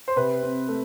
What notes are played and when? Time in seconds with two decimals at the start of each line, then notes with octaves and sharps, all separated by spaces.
0.08 C5
0.16 C3 B4
0.42 C4
0.68 A3